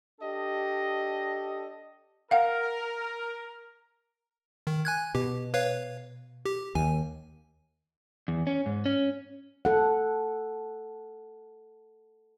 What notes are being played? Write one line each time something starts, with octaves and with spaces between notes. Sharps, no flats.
D4 G4 A4 D#5
A#4 F5 F#5
D#3
G#5 F#6 G#6
B2 G4
B4 C#5 F5
G4
D#2 G#5
E2
C#4
G#2
C#4
A4 F#5